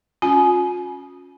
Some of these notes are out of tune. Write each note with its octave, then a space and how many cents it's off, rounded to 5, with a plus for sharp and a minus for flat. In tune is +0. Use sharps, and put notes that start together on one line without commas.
C#4 +0 F4 +45 G#5 +25